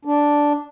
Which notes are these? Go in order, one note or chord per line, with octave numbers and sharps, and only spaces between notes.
D4